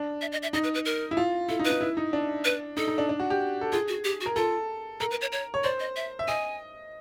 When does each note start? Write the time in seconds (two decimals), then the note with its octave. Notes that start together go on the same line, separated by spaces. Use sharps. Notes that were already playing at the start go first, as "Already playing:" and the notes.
Already playing: D4
0.21 E5
0.32 D#5
0.43 E5
0.53 D#4 D#5
0.64 B4
0.74 B4
0.85 A#4
1.11 E4
1.17 F4
1.48 E4 A4
1.59 D#4
1.65 B4
1.70 D#4
1.81 E4
1.97 D#4
2.13 D4
2.44 B4
2.77 D#4 A4
2.88 D#4
2.98 D4
3.09 D4
3.20 F#4
3.30 G4
3.61 A4
3.72 F4 G#4
3.88 F#4
4.04 G4
4.21 F#4
4.26 A#4
4.36 F4 A4
5.00 A4 A#4
5.11 B4
5.21 C#5
5.32 C#5
5.54 C#5
5.63 C5 D5
5.80 D#5
5.96 E5
6.19 E5
6.28 D#5 G#5